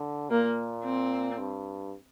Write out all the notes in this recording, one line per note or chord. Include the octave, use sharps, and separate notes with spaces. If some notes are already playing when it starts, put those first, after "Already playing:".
Already playing: D3
A#2 A#3
C4
G2